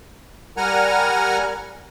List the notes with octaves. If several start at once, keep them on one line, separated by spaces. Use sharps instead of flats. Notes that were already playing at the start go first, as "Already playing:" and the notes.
G3 A#4 F#5 G#5 A#5 F6